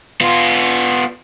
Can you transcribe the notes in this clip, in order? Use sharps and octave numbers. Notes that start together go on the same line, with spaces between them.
B3 F4